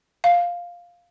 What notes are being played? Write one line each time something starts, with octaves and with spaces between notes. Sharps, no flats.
F5